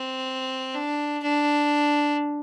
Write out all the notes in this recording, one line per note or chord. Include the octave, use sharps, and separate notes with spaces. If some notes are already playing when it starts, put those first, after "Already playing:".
Already playing: C4
D4
D4